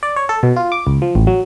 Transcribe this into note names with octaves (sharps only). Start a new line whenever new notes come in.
D5
C#5
A4
B2
F4
D6
C#2
F3
A1
F#3